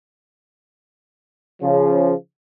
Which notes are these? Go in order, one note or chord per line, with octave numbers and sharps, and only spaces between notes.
C#3 F3